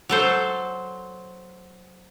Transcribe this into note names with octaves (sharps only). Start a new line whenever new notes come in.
F#3 A4 C5